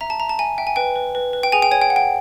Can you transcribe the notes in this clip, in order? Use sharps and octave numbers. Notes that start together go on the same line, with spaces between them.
E5 A#5
A5
E5 A#5
A5
E5 G#5
E5 G5
G#5
B4 G5
B4
B4
B4
G5
G#4 G#5
G5
C#5 G#5
G5
F#5
G5